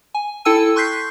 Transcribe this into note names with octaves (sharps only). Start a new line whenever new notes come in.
G#5
E4 A4 G5 A5 E6 D#7
C6 C#6 F#6 G6 B6 C7